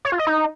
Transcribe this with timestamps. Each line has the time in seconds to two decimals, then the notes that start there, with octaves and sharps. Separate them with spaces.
0.05 C#5
0.12 F4
0.19 D#5
0.27 D#4